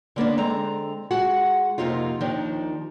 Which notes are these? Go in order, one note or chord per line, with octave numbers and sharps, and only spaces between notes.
D3 A#3 B3 D4
D3 G#3 C4 A#5
G#3 F#4 F#5
F2 C3 A#3 D#4 F4
D#2 D#3 F3 D4 D#4